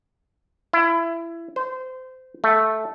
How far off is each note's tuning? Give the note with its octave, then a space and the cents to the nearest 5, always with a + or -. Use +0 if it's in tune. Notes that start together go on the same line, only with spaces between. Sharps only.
E4 +25
C5 -25
A3 -5